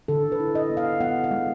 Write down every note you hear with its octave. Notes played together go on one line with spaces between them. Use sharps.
D3 A4
B4
E4
D#5
B3
F5
B3 F#5
F5
G#3